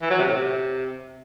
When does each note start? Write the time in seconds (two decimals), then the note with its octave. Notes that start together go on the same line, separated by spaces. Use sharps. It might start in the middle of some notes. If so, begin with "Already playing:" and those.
0.02 E3
0.10 F#3
0.19 C3
0.28 A2
0.36 C3